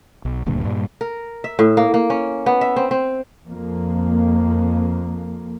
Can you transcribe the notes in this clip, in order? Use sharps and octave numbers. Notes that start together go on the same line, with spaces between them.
B1
D#1 D2 G2 A#2
G2 A#2 G3
A#4
E5
A2
A#3
A#3
C#4
B3
E5
C4
C4
F2 A#3